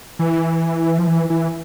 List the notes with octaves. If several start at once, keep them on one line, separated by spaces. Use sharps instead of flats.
E3
F3
E3
E3